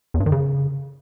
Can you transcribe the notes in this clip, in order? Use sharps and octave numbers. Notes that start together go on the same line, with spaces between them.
E2
G2
D#3
C#3